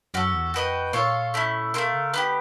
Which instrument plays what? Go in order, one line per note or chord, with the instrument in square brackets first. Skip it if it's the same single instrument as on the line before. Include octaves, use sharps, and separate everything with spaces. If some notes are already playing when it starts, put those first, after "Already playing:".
[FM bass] F#2 [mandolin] C#4 F#4 A4
[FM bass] E2
[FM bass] F2 [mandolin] F#4 B4 D#5 G5
[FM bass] A#2 [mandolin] F4 A4 C#5 F5
[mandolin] A3 C#4 E4
[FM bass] B2 [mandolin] A3 C4 F4 A#4
[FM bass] C#3
[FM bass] D3 [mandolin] B3 E4 G4